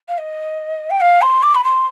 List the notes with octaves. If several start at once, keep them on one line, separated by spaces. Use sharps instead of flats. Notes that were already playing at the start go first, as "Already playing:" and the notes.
F5
D#5
G5
F5
C6
D6
B5
C6